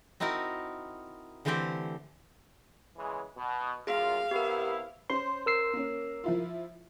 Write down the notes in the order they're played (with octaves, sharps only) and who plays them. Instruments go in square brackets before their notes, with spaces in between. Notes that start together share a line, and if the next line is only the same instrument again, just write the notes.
[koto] C4 D#4 E4 F#4 A#4
D3 E3 A3 C4 G4 C5
[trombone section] C#3 E3 G#3
B2
[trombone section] F#2 F4 [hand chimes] G#4 [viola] F5
[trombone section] C3 B3 E4 [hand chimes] G4 A#4
[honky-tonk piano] C#4 C5 [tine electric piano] C6
[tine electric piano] A#4 E6 C7
[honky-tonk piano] A#3 C#4
F3 E4 F4